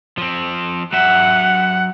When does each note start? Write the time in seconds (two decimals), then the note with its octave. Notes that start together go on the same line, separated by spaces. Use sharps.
0.18 F3 C4
0.93 F#3 E5 F#5